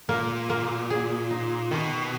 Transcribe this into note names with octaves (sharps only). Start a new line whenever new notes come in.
A#2 A#3
A#3
G#4
D#4
B2 D#3